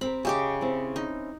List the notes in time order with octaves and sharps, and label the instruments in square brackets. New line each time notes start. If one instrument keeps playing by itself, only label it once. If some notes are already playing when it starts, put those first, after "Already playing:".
[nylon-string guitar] C4 G4 A#4 [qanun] B5
[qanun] C#3 G4 D6 [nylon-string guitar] F#4 D#5 E5
[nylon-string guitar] C4 C#4 E4
[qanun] D#4